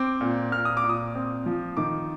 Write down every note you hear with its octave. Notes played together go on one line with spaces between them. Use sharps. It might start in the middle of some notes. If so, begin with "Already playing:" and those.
Already playing: C4 D6
A#2
A#2 F6
D#6
D6
A#2
D#6
C4
F3
D#3 D6